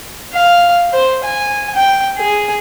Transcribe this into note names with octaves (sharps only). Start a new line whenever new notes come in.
F5
C5
G#5
G5
G#4